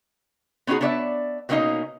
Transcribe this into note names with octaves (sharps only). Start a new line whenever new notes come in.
B3 C#4 D#4 E4 F#4 G#4
B3 D4 C#5 D5 E5
B2 E3 A#3 C#4 D#4 D#5